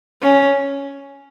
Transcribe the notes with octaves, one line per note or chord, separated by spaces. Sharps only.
C#4